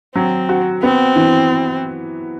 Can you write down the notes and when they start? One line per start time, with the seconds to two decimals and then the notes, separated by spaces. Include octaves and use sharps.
0.15 F#3 C4
0.49 F#4
0.83 B3 C4
1.16 E3